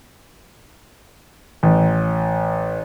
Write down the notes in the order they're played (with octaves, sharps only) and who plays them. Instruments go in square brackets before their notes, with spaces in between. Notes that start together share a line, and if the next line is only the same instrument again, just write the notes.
[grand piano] A1